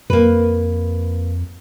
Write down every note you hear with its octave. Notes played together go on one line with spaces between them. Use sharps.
F2 A#3 B4